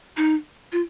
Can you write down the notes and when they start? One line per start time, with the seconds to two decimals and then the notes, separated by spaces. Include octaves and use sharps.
0.17 D#4
0.72 F4